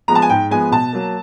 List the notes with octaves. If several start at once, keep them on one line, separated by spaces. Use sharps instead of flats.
F3 G#3 B3 A#5
A5
G#5
G#2 G5
F3 G#3 B3 G#5
B2 A5
F#3 A#3